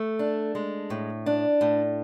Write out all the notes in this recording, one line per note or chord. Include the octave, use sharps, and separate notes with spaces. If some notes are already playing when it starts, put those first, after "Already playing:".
Already playing: A3
D4
G#3
A2
D4
A2